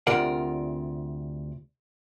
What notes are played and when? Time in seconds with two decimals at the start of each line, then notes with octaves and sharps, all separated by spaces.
0.07 D2 C3 F4 A#4 D5 F#5